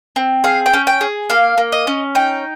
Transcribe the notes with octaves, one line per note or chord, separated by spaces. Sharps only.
C4
G#4 F5
G5
C#4
G5
G#4
A#3 F5
A#3
D#5
C#4
D#4 G5